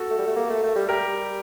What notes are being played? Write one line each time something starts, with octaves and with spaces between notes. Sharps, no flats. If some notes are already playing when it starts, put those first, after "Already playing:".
Already playing: F#4 A4
A3
G3
A3
A#3
A3
A3
G3
G3 G4 A#4